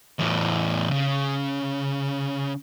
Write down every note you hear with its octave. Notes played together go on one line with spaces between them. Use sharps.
E2 A2
C#3